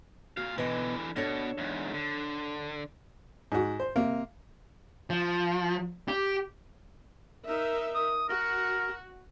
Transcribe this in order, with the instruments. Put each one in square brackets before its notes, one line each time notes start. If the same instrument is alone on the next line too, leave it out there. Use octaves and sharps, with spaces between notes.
[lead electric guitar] A#2 F5 [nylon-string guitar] F#4
[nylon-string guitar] B2 D#5 [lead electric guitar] D3 E3
[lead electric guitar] B2 [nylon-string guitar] D4 A4 C#5
[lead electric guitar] E2 G#2
D3
[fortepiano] G#2 F#4
C5
C3 A#3
[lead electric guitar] F3
G4
[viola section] D#4 A#4 E5
[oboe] D#6
[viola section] F#4 [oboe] A#4